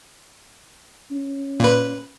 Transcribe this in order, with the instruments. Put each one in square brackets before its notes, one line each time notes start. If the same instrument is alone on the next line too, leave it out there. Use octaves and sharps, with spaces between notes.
[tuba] C#4
[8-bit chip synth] A#2 B4